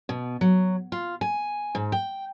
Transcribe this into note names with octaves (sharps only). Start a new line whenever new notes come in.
B2
F#3
F4
G#5
G#2
G5